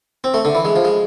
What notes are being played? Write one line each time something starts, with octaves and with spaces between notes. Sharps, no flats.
C4
A3
D3
E3
G#3
F3
G#3